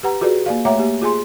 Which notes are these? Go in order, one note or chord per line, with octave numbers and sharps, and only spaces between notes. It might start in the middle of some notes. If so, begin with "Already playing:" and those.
G4 B4 F#5 A#5
F4 F#4 G#4 B4 D5
A#3 D5 F5
A3 C#5 E5 F#5 A#5 D6
A#3 G4
F4 G#4 G#5 C6